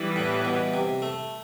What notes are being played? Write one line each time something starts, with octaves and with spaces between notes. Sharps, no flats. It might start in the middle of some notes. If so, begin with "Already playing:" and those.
Already playing: E3 G3 B3 E4 B4
A2
B2
C3
A3